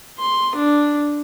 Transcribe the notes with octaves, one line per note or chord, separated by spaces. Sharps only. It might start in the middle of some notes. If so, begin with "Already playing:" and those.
C6
D4